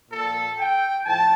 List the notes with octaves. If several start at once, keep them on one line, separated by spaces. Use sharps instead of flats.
A#2 F3 A4
G5
A2 F3 A5